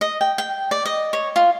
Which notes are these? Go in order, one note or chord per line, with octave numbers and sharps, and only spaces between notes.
D#5
G5
G5
D5
D#5
C#5
F4